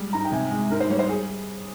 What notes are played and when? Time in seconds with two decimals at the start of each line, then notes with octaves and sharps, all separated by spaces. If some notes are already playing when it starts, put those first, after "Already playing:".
Already playing: G3 G#3
0.13 G#2 A#5
0.25 G5
0.32 C3 G#5
0.51 G#3
0.71 G#2 A#4
0.80 C5
0.90 G3 C#5
0.99 C5
1.09 G#4